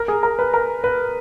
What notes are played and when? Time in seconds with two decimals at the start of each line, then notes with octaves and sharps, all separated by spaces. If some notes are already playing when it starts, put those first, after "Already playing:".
Already playing: A#4
0.08 G#4
0.23 A#4
0.39 B4
0.54 A#4
0.84 B4